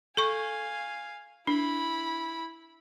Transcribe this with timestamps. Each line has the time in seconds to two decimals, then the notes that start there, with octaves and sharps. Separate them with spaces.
0.17 A4 F5 G#5 C#6
1.47 D4 E4 B5